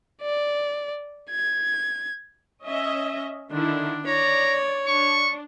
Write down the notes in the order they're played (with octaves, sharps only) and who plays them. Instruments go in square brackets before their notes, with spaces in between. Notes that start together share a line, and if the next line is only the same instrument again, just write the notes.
[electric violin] D5
G#6
[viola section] C#4 D#5 E5
[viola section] D3 D#3 E4 [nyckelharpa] D4
[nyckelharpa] C#5 [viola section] D5 [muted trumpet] A#5
[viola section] D4 [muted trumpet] C#6